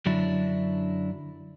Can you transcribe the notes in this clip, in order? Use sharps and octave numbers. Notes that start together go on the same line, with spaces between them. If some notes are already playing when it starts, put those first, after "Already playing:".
F#2 D3 F#3 D4 E4